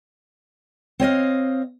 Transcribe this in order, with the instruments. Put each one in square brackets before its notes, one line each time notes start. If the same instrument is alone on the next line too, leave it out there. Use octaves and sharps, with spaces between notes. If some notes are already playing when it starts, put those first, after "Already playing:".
[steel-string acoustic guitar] C4 C#5 D#5 F5